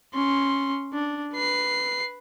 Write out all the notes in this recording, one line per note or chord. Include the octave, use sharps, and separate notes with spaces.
C#4 C6
D4
B4 C7